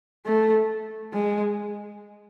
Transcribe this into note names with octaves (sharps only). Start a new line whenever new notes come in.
A3
G#3